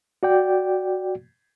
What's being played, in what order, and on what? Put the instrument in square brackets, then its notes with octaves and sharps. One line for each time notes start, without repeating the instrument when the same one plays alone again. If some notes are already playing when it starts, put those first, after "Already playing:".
[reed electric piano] F#4 D5 G5